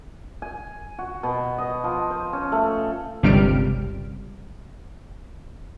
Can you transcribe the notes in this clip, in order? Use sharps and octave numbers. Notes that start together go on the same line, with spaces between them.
G#5
F#4
B2
D#5
F3
C5
C#4
A3
G1 C#2 C3 G3 F6 D7